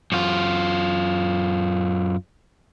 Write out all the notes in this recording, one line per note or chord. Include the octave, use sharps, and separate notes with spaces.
F#2 F4